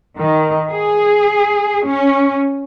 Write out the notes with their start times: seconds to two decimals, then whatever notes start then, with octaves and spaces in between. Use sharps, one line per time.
0.18 D#3
0.72 G#4
1.86 C#4